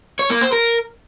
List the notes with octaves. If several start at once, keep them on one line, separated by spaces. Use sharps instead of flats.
C#5
A#3
C5
A#4